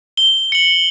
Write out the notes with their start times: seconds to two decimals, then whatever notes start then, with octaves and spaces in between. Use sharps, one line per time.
0.17 G7
0.52 C#7 F#7